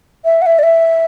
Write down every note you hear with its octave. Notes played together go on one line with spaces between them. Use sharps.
E5
F#5
E5
D5
E5